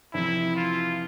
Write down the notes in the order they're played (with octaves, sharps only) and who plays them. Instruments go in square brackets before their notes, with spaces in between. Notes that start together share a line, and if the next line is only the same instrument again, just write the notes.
[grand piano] F2 C3 E3 [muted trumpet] E4
[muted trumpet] F4